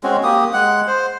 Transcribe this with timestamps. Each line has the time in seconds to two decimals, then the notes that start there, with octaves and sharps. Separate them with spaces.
0.04 G#3 C4 C#4 F#4
0.23 A#3 G4 D#6
0.53 G#3 F#5
0.88 C5